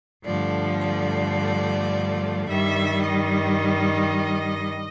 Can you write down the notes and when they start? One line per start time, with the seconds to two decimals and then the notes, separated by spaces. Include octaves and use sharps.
0.25 G2 D3 F3 A3 D5
0.80 D5
2.48 G2 D#3 G3 E5
3.03 D#5